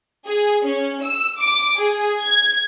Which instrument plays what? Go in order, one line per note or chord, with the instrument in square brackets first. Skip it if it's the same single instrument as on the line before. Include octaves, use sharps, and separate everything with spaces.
[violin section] G#4
C#4
E6
D6
G#4
G#6